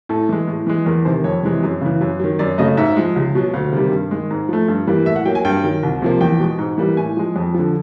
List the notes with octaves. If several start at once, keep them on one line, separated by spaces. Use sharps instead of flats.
A2 A4
E3 G#3
A2
E3 G#3
E2 A#4
C3 D#3 C5
F2 C#5
C3 E3 G#3
F#2
C#3 E3
F#2
D#3 F#3
F#2 D5
C#3 F#3 A3 D#5
G#2 E5
F3 G#3
C#2
B2 F#3
D2 F5
C3 D#3 G3
G2
D#3 G#3
G#2
F3 A3
G2
E3 G3 A#3
A2 E5
F#5
F#3 A#3 G5
G#5
G2 G5
D#3 F#3
C2
C3 F3 A#3
E2 G5
B2 G#3
G#2
E3 G3 A#3
A2 G#5
F3 G#3
F2
D3 F3